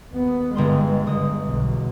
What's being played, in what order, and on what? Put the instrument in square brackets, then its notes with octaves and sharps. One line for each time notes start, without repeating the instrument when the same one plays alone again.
[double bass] D#2 B3
[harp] G1 B3 C6 [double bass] G#3
[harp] G1 D#6
[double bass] B1 E2